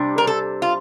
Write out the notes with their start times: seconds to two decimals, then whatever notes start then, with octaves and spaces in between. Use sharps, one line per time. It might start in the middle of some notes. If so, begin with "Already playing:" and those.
Already playing: C3 G3 D4
0.18 A#4
0.27 A4
0.62 F4